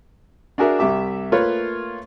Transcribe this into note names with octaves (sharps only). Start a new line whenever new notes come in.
D4 F#4 G#4 A#4 E5
C2 G4 E5 D6
A3 A#3 F4 B4 C#5